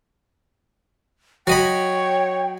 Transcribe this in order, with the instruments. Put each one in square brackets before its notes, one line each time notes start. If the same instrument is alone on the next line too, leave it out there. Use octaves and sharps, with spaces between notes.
[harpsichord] F#3 D#5 B5 [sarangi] C#5 [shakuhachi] G5